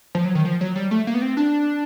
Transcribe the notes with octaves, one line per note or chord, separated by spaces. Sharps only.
F3
F#3
D#3
F3
F#3
G3
A3
A#3
B3
C4
D4